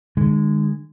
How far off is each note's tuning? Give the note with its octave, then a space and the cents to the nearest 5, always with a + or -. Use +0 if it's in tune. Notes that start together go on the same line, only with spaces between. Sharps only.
D3 +45 G#3 -15